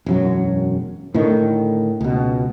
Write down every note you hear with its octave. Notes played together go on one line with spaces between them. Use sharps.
E1 F#2 F#3
A2 D3 D#3
C#2 B2